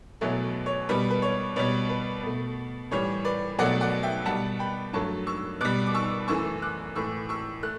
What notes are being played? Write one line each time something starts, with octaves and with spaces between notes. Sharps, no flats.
E2 B2 F#3 A3 C#5 E5
C#5
B2 G3 B4
B4
C#5
B2 G3 C#5
B4
B2 A3
A2 E3 G3 C#5
B4 D5
B2 F#3 A3 D5 F#5
D5 F#5
E5 G5
B2 G3 F#5 A5
G5 B5
G2 F#3 A3 A5 C#6
C#6 E6
B2 G3 D6 F#6
D6
C#6 E6
F#2 E3 A3 C#6 E6
D6 F#6
A2 E3 A3 C#6 E6
C#6 E6
A3 F#6